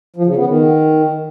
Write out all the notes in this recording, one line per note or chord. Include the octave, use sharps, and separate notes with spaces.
F3
C#3
B3
D#3